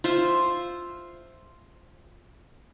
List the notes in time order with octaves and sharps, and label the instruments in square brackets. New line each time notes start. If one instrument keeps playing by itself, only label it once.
[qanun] F4 C5 E5